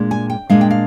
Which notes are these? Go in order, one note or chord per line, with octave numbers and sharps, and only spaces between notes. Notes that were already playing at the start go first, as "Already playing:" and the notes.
Already playing: A#2 G#3 D4
G#5
G5
A#2 G#3 D4 F5
G5
F5